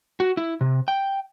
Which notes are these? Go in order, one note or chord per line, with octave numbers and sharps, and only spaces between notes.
F#4
E4
C3
G5